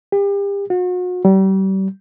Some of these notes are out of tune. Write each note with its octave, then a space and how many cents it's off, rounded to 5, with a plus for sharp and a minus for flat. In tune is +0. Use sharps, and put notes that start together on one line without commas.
G4 +35
F#4 -40
G3 -35